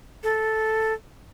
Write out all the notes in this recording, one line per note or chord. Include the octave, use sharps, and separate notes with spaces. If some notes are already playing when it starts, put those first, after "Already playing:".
A4